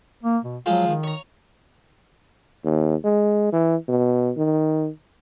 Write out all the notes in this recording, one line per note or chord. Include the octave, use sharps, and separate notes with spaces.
A#3
B2
F3 F#3 G#3 F4
D#3
C#5 A#5
D#2
G#3
E3
B2
D#3